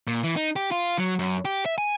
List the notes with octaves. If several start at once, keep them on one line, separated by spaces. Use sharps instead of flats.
A#2
E3
D#4
G4
F4
F#3
F#2
G4
E5
G#5